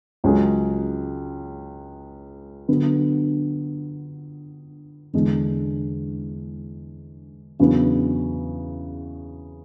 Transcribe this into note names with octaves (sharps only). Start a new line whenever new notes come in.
C#2 C#3 F#3 C#4 G#4
D3 F#3 B3
E2 D3 G#3 D4
E2 C#3 F#3 B3 D4